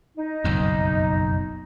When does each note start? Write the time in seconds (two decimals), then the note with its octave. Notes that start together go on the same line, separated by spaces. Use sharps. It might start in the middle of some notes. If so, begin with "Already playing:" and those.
0.17 D#4
0.44 F#1 B1 F2